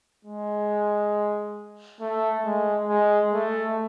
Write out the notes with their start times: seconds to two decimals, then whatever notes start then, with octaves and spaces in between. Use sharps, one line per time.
0.25 G#3
2.01 A3
2.45 G#3
2.89 G#3
3.33 A3